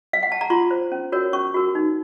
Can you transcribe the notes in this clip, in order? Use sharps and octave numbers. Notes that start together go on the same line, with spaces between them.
F5
F#5
A5
A#5
F4 C6
C5
C#4
F#4 A#4 C#5
C#4 C#6
F#4 A#4
D#4